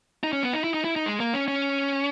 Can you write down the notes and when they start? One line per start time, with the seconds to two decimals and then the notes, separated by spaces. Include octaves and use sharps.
0.23 D#4
0.33 C#4
0.43 B3
0.53 D#4
0.64 E4
0.74 D#4
0.84 E4
0.96 D#4
1.06 G#3
1.20 A#3
1.34 C#4
1.48 C#4